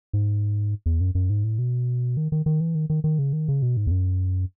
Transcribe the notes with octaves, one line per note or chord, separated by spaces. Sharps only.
G#2
E2
F#2
F#2
G#2
A2
B2
D#3
D#3
D#3
E3
D#3
D#3
D#3
C#3
D#3
C#3
B2
G#2
E2
F#2